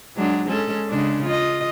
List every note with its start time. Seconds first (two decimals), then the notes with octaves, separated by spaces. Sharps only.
0.16 F#3 G#3 D4
0.47 G#3 C#4 A4
0.89 C#3 G#3 D4
1.24 F4 D#5